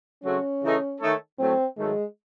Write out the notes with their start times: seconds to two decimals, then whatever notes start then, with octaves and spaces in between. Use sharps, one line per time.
0.24 C#3 F#3 A3 C4 C#4 F#4
0.62 C#3 E3 A3 D#4
1.01 D#3 A3 D#4 A4 C#5
1.39 A2 F#3 A3 C4
1.77 G#2 D#3 F#3 G#3 A3